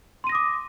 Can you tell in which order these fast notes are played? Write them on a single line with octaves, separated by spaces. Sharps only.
C6 D#7 A#6 D#6 D6